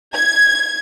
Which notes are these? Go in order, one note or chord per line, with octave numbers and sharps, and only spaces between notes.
G#6